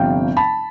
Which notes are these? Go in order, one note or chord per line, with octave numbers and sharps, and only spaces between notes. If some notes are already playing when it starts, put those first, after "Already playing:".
Already playing: G1 C3 F3 F5 G5
A5 B5